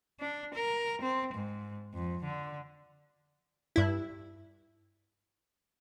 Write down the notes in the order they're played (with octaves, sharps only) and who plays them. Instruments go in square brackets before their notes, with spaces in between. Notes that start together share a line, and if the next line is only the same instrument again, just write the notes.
[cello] D4
A#4
C4
G#2
F2
D3
[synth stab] G2 E4